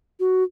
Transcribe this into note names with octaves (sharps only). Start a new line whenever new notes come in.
F#4